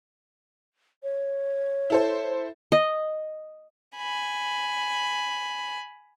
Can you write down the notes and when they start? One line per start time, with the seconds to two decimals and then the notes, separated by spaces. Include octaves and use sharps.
1.03 C#5
1.90 E4 A4 C5
2.72 D#5
3.96 G#5 B5